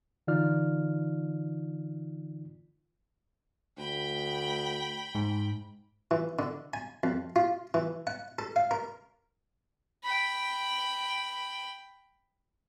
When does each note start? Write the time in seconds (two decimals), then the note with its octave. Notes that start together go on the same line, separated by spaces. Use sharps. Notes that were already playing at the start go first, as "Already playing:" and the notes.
0.27 D3 E3 D#4 F4 D5 F6
3.78 D2 G5 B5
5.15 G#2
6.11 E3
6.39 D3
6.73 G#5
7.03 F2
7.36 F4
7.74 E3
8.07 F#5
8.39 A4
8.56 F5
8.71 A#4
10.04 G5 B5